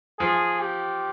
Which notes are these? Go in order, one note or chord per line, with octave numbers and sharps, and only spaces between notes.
F3 G#4
G4